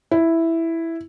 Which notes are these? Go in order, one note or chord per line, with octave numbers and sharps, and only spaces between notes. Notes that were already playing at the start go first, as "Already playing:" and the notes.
E4